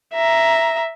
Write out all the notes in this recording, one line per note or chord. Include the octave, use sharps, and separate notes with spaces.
E5 A#5